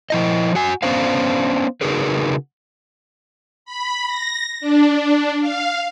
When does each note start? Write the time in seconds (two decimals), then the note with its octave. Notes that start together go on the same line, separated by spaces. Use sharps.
0.10 F3 E4 D#5
0.55 F#4 G#5
0.83 B3 C#4 D4 C5 F5
1.81 C#3 D#4 F#4 G#4 A#4 B4
3.65 B5
4.07 A#6
4.61 D4
5.41 F5